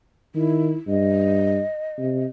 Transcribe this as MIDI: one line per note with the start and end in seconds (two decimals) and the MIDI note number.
0.35 0.75 51
0.35 0.76 64
0.88 1.60 43
0.88 2.25 75
1.99 2.26 48